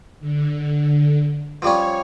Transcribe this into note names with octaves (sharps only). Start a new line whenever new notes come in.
D3
F3 G3 C#4 C#5